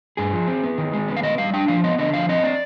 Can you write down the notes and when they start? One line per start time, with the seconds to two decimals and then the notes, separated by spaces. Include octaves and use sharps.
0.17 G2 G#4
0.33 F3
0.48 C4
0.63 B3
0.78 D#3
0.93 G#3
1.08 B3
1.17 F5
1.23 D#3 D#5
1.38 G3 F5
1.53 D4 G5
1.68 F3 F5
1.84 B3 D#5
1.98 D3 D#5
2.13 F3 F5
2.29 C4 D#5
2.44 D5